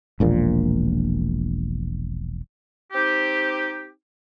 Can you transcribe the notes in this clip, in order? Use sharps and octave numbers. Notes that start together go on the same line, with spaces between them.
E1 A#1 A#2
C4 D#4 G4